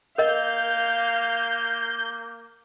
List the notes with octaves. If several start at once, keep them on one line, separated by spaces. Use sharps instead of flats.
A#3 A#4 D#5 F5 G6